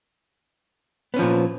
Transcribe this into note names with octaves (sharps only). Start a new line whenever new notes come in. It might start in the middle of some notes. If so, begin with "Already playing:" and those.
A#2 F3 B3 C#4